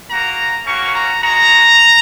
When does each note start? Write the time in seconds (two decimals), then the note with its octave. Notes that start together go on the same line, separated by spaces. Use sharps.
0.10 A#3 F#4 A#5
0.66 A#3 C#4 F#4 C#6
0.94 A#5
1.22 G#3 F#4 A#5